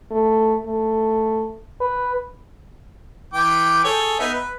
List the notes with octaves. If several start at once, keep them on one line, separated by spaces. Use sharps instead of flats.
A3
A3
B4
E3 G5 D6
G#4 A4 C#5
B3 D#4 E5
B4